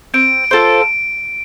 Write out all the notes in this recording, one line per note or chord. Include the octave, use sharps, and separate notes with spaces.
C4 D7
F4 A4 C5